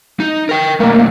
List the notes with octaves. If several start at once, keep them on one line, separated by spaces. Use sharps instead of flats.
D#4
A#4 G5
B1 A3 A#3